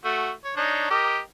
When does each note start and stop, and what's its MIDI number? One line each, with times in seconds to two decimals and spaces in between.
0.05 0.30 57
0.05 0.30 66
0.44 0.52 73
0.57 0.86 62
0.57 0.86 63
0.57 0.86 73
0.90 1.19 67
0.90 1.19 70
0.90 1.19 75